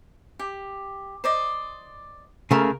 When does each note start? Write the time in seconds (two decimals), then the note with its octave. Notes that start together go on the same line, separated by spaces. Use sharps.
0.39 G4
1.24 C5 D5 D#5
2.51 C#3 A3 A#3 A#4